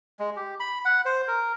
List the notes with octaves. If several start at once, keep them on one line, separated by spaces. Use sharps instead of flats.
G#3
G4
B5
F#5
C5
A#4